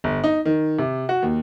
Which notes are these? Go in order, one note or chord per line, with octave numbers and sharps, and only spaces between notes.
G1
D#4
D#3
C3
F#4
D#2